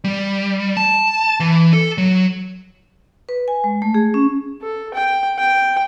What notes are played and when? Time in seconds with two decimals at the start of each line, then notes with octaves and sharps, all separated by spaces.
0.04 G3
0.77 A5
1.40 E3
1.73 A4
1.98 F#3
3.29 B4
3.48 G#5
3.64 G#3
3.82 A3
3.94 G#4
4.14 C#4
4.62 A4
4.94 G5
5.38 G5